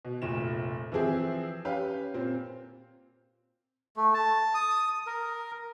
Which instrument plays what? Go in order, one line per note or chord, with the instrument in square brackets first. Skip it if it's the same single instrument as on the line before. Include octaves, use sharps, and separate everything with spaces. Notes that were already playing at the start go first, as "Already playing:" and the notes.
[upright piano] B2
F1 A#1 E7
E3 F3 C4 G#4 E5
C#4 G4 B4 F5
A#2 C4
[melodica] A3
A5
D#6
A#4